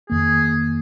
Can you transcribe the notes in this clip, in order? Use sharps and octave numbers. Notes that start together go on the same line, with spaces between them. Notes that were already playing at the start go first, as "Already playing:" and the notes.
F2 D#3 A#3 G#4